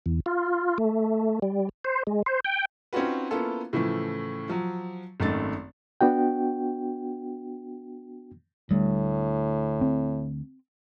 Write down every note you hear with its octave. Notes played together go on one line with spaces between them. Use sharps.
E2
F4
A3
G3
C5
G#3
C5
G5
C4 C#4 D#4 F4 F#4 B4
A#3 B3 C#4 E4 F4 A4
A2 C#3 E3 F3 A3
F3 F#3
G#1 F#2 D#3 A3 A6
B3 D4 F#4 G5
D2 A2 G3
C4